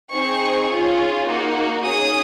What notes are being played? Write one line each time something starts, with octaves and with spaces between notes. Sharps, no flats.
C4 D#4 G#4 C#6
C#4 F4 G#4
A#3 D#4 F#4
C#4 G#4 D#6